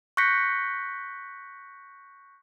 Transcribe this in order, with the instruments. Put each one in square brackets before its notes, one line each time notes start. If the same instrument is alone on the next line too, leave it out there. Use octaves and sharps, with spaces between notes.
[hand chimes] C#6 F#6 G6 A#6 B6 C#7